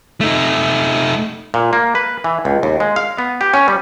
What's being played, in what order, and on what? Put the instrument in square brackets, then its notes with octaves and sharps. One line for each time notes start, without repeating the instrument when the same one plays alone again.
[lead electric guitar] A3 D#4
[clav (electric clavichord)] A#2
A#3
B4
E3
C#2
D#2
G#3
F5
B3
G4
C#4
G3